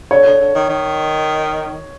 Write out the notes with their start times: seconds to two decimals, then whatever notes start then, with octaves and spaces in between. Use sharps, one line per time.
0.11 D3 C#5
0.26 D3
0.41 D3
0.55 D#3
0.69 D#3